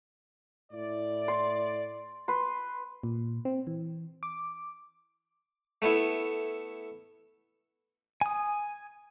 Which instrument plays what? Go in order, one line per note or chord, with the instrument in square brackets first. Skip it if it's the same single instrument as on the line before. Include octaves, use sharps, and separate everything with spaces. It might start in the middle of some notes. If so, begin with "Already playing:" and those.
[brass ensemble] A2 E4 D5
[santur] C6
B4 C6
[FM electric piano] A#2
C4
E3
D6
[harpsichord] A3 B3 E4
[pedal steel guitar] G#5 D#6